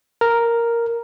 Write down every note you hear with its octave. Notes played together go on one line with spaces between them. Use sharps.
A#4